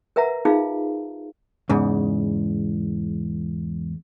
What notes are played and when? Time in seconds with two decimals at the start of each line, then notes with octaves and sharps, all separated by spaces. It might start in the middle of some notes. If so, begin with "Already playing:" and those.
0.16 A#4 B4 E5 F#5 A#5
0.45 D#4 F4 G#4 F5
1.69 E2 G#2 C#3